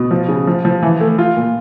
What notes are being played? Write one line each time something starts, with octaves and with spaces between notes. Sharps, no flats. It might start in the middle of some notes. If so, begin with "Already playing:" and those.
Already playing: B2
F3
C#3
F3
F3
E3
A3
F4
A#2